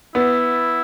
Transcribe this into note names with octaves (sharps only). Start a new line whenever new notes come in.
B3 E4